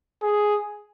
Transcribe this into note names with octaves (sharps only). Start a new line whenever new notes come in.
G#4